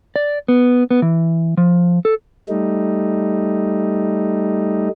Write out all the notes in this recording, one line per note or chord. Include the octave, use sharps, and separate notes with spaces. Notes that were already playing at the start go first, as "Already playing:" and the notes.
D5
B3
B3
E3
F3
A4
G3 A3 D#4